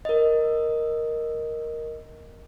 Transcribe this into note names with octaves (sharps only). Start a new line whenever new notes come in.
A#4 D#5